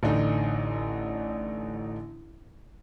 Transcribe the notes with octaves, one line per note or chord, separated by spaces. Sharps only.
A1 D3 D4 D#4